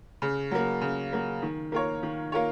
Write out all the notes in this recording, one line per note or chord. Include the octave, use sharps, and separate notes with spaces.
C#3
F#3 A#3
C#3
F#3 A#3
D#3
A#3 F4 A#4 C#5
D#3
A#3 F4 A#4 C#5